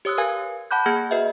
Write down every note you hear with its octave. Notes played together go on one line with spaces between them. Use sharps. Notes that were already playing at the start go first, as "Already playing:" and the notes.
G4 C#5 D#6 E6 F#6
A#4 B4 F5 G#5 G#6
F#5 A5 B5 D6 F#6 G6
A#3 G#4 F#5 F6 G#6 C#7
F#4 B4 D#5 E5